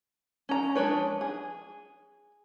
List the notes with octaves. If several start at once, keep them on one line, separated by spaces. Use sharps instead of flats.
C#4 A#5
F3 G#3 D4 B4 C#5
G#4